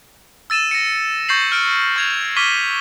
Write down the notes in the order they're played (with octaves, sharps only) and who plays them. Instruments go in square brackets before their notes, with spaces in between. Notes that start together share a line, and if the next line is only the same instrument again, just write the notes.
[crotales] E6 A6 D#7 E7
A#6 C#7
C#6 G6 A6 A#6 C7 F#7
F6 D7
C#6 G#6 F7
C#6 D6 F6 B6 D#7 G7